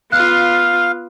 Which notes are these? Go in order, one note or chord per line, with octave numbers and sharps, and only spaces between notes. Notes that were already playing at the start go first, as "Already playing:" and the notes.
B3 F4 F5 F#6